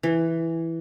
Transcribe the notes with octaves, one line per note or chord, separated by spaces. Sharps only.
E3